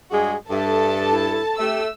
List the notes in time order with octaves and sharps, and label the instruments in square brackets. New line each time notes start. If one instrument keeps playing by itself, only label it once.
[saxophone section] G2 G#3 F#4 [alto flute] G#4
[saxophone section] G2 [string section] A4 A5 [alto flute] E5
[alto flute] E4
[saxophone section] A3 [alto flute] G4 [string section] E6